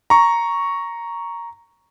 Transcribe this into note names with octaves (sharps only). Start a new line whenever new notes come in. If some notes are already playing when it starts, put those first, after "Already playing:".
A#5 C#6